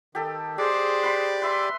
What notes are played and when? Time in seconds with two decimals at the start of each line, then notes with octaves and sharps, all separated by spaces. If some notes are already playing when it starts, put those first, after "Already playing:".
0.15 D#3 G4 A4
0.58 G#3 G4 G#4 C5 D5 D6
1.03 B4 B5 C6
1.42 B4 E5 C6